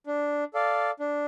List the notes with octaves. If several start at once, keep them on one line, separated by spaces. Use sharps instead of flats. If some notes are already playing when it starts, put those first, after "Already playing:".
D4
A4 D5 F5
D4